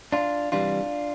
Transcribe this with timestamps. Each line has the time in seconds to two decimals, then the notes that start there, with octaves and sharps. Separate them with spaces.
0.13 D4 F4
0.52 C2 C3 E3 G3 D4 F4